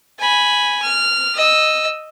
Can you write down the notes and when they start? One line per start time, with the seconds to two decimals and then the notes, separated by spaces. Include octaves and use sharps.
0.19 G#5 B5
0.82 F6
1.35 D#5 E6